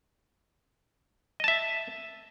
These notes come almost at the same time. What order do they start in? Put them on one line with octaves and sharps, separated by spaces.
D#5 A5 E5